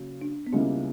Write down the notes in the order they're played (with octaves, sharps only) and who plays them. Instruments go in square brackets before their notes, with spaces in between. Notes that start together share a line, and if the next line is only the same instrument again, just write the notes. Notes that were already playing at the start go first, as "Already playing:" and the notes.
Already playing: [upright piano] C#3 F#3 A#3
[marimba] D4
B3
[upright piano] C#2 C#3 G3 A#3 E4 [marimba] C#4